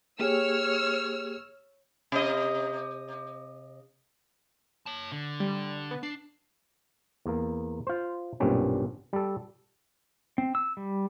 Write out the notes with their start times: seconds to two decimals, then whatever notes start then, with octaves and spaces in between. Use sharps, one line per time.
0.20 A#3 G4 G#4 C#5 E6 F6
2.12 C3 D#5
4.86 C#5 A5
5.12 D3
5.40 G3
5.91 B3
6.03 D4 C7
7.26 E2 A#3
7.87 F4 C5
8.40 B1 G2 A#2 C4 C#4
9.13 G3 A4
10.38 C4
10.55 E6
10.77 G3